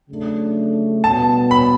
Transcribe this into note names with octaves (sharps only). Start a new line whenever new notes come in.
C#3 F#3 A3 D4
B2 G3 B3 A5
B5